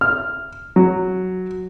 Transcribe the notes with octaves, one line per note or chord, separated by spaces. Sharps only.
F6
F#3